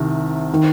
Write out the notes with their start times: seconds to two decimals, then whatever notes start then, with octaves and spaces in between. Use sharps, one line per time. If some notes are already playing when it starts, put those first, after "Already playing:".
Already playing: C2 C3 D#3
0.53 D#3